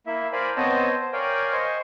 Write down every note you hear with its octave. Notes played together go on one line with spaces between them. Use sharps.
A#3 E4 E5
A#4 C5 D5 F5 G#5 B5
B3 C4 C5 C#5 D#5 A5
C5
A#4 C#5 D5 F5 G5 G#5
C5 D#5 G#5 C6 C#6